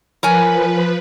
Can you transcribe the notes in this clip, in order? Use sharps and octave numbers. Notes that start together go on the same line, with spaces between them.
F3 A#4 B4 C#5 G#5